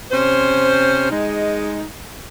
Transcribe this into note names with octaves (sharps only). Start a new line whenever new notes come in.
C3 C#4 C5
G#3 D#4